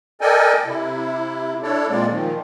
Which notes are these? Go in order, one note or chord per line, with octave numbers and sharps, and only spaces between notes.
A4 A#4 D5 D#5 G5 G#5
C3 E4
D4 E4 A4 C#5 D5
A#2 G#3 A#3 C4 D5
A#2 D#3 F3